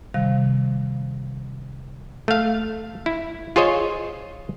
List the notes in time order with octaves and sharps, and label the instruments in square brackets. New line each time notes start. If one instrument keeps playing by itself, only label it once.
[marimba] C3 D#3 G3 F5
[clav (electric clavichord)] A3 F5
E4
F4 G#4 C5 C#5 D#5